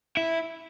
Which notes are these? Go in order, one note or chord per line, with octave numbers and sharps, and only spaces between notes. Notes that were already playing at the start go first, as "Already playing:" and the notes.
E4